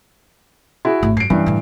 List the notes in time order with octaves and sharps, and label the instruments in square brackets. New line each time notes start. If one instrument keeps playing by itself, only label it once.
[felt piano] E4 F#4 G#4
[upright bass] G#1 A2
[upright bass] F#2 [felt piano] C7 D7
[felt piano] G2 E3 [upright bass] C#4
[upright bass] A2 D3